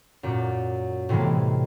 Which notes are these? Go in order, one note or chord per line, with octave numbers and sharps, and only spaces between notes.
F#2 A#2
A2 C3 E3 G#3 A#3